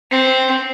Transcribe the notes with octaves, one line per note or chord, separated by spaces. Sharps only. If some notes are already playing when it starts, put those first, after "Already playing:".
C4